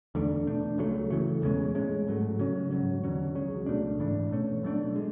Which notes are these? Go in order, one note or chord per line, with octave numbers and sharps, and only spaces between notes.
E2 D3 A3 D4
B2 A3 D4
C#2 C#3 F#3 A3
C#3 E3 A3
E2 B2 G#3 C#4
A2 G#3 C#4
G#2 F#3 A3
C#3 F#3 C#4
G#2 F#3 C#4
E2 D3 F#3 C#4
C#2 C#3 F#3 C#4
C#2 B2 A3 D4
G#2 E3 A3 D4
B2 A3 C#4
B2 F#3 A3 D4
G#3